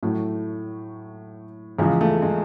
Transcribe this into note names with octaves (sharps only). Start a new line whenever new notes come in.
A2 F#3 A3
E2 C#3 F3 G#3
A3
G#3